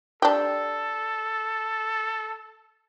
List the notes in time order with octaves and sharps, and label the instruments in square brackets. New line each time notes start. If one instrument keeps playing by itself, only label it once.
[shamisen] D4 G4 [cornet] A4